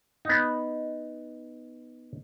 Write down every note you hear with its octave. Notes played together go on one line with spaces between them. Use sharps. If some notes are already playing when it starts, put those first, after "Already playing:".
B3 D#4